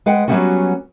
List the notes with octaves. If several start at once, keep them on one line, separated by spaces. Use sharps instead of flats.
G#3 B4 F#5 G5
F#3 G3 A#3 B3 C#4 F#4